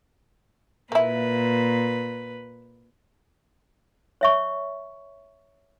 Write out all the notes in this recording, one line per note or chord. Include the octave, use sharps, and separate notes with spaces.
A#2 A#3 E4 B4
C#5 E5 C#6